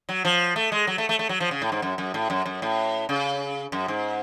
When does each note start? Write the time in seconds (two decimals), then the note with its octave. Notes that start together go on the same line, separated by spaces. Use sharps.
0.09 F#3
0.25 F3
0.56 A3
0.72 G#3
0.87 F#3
0.98 A3
1.09 A3
1.19 A3
1.29 F#3
1.40 F3
1.51 C#3
1.62 A2
1.72 G#2
1.82 F#2
1.98 F#2
2.14 A2
2.30 F#2
2.46 F#2
2.62 A2
3.09 C#3
3.72 F#2
3.88 G#2